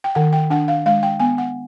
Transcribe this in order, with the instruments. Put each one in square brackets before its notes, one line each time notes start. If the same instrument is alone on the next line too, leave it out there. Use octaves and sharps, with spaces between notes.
[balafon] G5
D#3 F#5
G5
D4 F#5
F5
G#3 F5
G5
B3 G#5
F#5